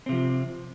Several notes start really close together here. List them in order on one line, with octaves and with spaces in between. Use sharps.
C4 C3 F3